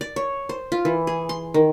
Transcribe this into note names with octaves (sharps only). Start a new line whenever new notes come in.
D5
C#5
C5
F4
E3
G#4
C6
D#3